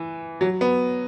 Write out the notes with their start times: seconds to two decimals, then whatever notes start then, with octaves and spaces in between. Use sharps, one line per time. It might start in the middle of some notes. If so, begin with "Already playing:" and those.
Already playing: E3
0.41 F#3
0.61 B3